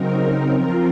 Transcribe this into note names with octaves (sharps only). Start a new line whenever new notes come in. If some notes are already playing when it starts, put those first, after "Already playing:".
Already playing: C#3 F#3 C4 D#4 A#4
F3 C4 F4 A#4